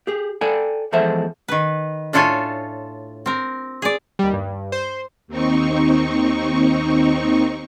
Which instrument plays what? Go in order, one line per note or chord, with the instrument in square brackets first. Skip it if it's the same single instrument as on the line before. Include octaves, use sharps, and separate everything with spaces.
[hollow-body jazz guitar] G4 G#4
A4 D5 G5 G#5
E2 F3 G#3 A4 C5 E5
[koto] D#3 B4
A2 D4 F4 A4 C#5 G#5
C4 A#4
G#4 D5
[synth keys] D#2 G3
G2
C5
[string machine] D#2 C4 D#4 C#6